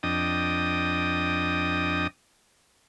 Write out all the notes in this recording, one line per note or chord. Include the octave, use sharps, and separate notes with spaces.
F2 D4 D#5 G5 D#6